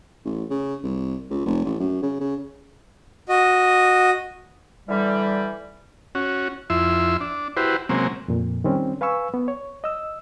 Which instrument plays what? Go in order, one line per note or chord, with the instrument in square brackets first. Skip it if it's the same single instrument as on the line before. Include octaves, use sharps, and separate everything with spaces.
[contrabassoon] A1
C#3
C2
C#2
F1
A1
F#2
C#3
C#3
[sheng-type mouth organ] F#4 D#5
[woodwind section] D3 E3 G3
[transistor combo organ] C#4 F#4
F2 E4 E5 C6
D4
E4 F#4 G4 B4 C5
C3 F#3 G#3 A#3 C4 C#4
[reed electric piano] F2 A#2
D#3 G3 C4 C#4
B4 F5 G#5 B5 C#6 E6
B3
C#5
D#5 E6